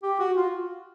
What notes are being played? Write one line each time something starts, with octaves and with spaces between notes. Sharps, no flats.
G4
F#4
F4